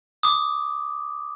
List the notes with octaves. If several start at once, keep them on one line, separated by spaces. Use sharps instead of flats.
D6 D#6